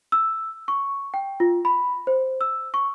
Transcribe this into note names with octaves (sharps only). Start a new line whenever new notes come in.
E6
C#6
G5
F4
B5
C5
E6
C#6